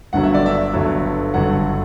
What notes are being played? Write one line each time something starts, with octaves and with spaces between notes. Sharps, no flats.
G1 G2 D3 F#3 F#5
E5
D5
E5
G1 G2 D3 F#3
G1 G2 D3 F#3 F#5